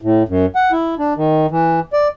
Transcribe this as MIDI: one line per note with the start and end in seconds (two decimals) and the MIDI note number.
0.01 0.23 45
0.29 0.46 42
0.55 0.71 78
0.72 0.95 64
0.99 1.14 62
1.17 1.46 51
1.51 1.80 52
1.93 2.08 74